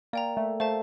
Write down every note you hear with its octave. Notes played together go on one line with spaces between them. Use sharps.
A#3 D5 G5 A#5
A3
A3 C5 F5 A5